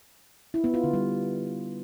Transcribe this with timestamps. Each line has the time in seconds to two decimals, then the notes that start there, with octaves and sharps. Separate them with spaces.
0.54 E4
0.64 B3
0.74 F4
0.84 D3
0.93 G3